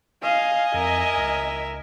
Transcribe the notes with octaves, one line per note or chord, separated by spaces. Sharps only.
D#5 F5 G#5
F2 A#4 E5
C#2